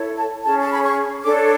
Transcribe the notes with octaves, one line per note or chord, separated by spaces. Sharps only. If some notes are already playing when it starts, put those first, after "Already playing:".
Already playing: E4 A4 C#5
A5
C#4 G#4 C#5 A5
A5
B5
C#6
D4 A4 C#5 D6